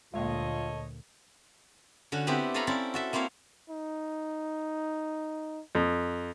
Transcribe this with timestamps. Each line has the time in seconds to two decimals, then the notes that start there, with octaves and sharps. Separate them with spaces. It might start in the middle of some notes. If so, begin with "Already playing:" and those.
0.14 D2 A#2 G#3 A#3 F4 A4 C#5 D#5
2.12 D3 C#4 F#4
2.27 B3 C4 D4 E4 G4
2.54 A4 C#5 F5 G#5 A#5 B5
2.67 C4 C#4 E4 A4 D5
2.94 F#4 A4 E5
3.13 A#3 C4 E4 C#5 F5
3.70 D#4
5.75 F2